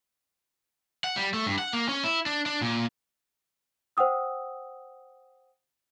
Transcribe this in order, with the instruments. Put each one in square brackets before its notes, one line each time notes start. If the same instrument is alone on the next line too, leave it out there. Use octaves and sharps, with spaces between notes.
[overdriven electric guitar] F#5
G3
A3
G2
F#5
A#3
C#4
E4
D4
D4
A#2
[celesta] C5 F#5 G5 D#6 E6